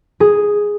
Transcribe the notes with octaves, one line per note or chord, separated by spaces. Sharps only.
G#4